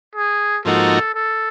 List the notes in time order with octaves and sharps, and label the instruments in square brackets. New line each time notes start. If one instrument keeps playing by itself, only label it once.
[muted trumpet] G#4
[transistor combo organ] G#2 F3 A#3 D#4 F#4 [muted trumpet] A4
[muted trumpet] A4